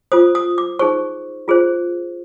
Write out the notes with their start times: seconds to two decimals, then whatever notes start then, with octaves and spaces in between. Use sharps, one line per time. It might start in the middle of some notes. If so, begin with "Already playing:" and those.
0.12 F4 A4 C5 D#6
0.35 D#6
0.58 D6
0.79 D#4 G#4 C5 C#6
1.48 F4 G#4 C5